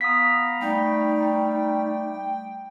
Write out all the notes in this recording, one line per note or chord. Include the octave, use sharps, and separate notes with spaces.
B3 F5 A#5 D#6 B6
G3 A3 D#4 G5